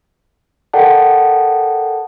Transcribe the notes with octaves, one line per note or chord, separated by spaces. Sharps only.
A4 A#4 D5 F#5 G5 A5